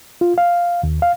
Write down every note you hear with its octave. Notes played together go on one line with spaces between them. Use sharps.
F4
F5
D#2
F5